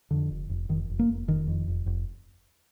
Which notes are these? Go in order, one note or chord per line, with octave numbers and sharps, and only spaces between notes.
F2 D3
F1
F1
F1 D#3
F1
A#3
F1
F1 D#3
F2
F1
F1